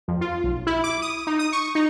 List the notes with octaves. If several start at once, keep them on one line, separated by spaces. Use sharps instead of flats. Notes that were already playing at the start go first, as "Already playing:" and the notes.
F2
F4
B1
E4
D6
D#6
D#4
D#6
C#6
D#4